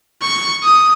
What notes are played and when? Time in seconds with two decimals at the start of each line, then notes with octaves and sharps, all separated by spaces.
0.22 C#6
0.64 D#6